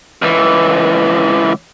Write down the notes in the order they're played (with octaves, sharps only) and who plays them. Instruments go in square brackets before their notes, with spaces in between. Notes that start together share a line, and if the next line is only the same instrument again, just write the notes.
[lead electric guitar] C#2 E3